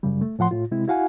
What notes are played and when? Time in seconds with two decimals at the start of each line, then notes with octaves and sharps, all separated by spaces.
0.03 F#2 C#3 G3
0.21 A3
0.39 A2 F3 F#5 C6
0.51 A2 F4
0.71 C3 G#3 C4 E4
0.88 E4 F#4 F5 F#5 G#5